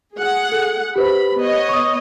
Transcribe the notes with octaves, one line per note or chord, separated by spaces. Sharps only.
G#4 F#5
A4
G4 B4 C5 B5
B3 C#5 D#5
C#6 D#6